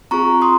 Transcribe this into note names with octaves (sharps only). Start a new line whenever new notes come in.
C4 F4 G#4 A#5 C#6
C6 D#6